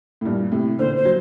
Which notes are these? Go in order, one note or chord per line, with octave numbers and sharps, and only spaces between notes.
A2
G2 A#2
A2 C3
A#2 D3 C5
C5
F#3